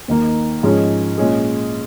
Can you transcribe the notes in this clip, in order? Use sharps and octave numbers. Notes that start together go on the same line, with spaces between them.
D#2 D#3 A#3 D#4
G#2 F3 G#3 C#4
A#2 G#3 C#4 G#4